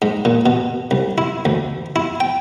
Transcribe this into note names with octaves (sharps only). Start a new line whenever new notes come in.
G#2
A#2
B2
C2
E4
D2
E4
G5